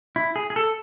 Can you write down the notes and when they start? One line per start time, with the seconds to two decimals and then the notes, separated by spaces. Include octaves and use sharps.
0.16 E4
0.36 G#4
0.50 G#4
0.56 A4